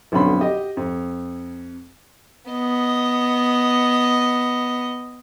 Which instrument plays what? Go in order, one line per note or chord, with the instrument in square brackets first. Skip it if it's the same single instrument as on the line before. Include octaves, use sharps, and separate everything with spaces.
[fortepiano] B1 F2 D3 C#4 B5 C6
G4 D#5
F2
[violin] B3 D#5